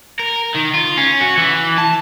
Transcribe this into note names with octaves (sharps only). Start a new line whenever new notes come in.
A#4
D#3
F4
C#4
F#4
E3
A5